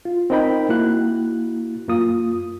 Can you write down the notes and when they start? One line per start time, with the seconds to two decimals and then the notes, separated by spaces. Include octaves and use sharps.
0.05 F4
0.30 C4 D#4 A#4 D#5 G5 B5
0.69 A#3 E4 F#4 F#6
1.88 F#2 A#3 F4 D#6